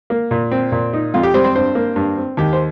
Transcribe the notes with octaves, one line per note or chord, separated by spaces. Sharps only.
A#3
A#2
C4
A#2
D#4
F2 F4
G4
G3 C4 C5
C4 C5
G2 C4 C5
A#3
G2
C4
D#2 G4
C5